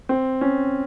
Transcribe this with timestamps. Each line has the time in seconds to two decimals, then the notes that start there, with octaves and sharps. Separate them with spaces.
0.09 C4
0.41 C#4